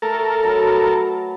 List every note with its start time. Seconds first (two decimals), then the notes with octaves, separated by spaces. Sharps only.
0.02 A3 A4 A#4
0.43 F#3 B4 B5